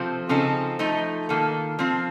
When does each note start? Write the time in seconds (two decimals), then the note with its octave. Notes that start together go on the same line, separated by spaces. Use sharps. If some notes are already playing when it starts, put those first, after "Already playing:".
Already playing: C3 F3 C4 F4 A4
0.29 C#3 F3 C4 D#4 A4
0.79 F3 A3 D#4
1.29 D#3 A#3 F4 A4
1.79 F3 C4 F4